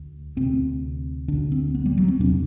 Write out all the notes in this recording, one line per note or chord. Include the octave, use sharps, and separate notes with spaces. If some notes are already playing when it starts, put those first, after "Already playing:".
Already playing: D2
D2 C3 C4
D2 D3 D4
C4
B3
G3
F#3
C4
E2 C3 D4